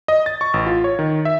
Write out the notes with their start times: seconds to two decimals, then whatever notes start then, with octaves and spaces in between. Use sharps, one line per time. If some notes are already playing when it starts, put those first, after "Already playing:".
0.08 D#5
0.26 A6
0.41 C#6
0.54 A1
0.66 F4
0.84 C#5
0.99 D#3
1.25 E5